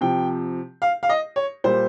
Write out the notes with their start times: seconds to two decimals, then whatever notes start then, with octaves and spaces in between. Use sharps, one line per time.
0.01 C3 F3 G5
0.82 F5
1.03 F5
1.09 D#5
1.36 C#5
1.64 A#2 G3 C5